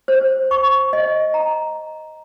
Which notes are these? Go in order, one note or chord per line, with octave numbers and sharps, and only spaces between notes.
C5
C#6
D#5
A#5